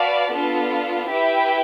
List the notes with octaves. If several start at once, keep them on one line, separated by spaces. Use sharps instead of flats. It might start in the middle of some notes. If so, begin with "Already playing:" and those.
Already playing: F#4 B4 D5 F5 A5
B3 D4 F4 A4
E4 G4 B4 E5 G5